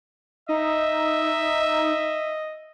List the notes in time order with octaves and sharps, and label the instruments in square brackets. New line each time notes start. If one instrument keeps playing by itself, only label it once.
[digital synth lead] D#4 [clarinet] D#5 [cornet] E5